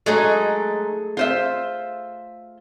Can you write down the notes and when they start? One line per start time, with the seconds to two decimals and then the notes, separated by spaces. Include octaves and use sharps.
0.06 F#3 G#3 A3 D#4 G#4
1.17 F4 C5 E5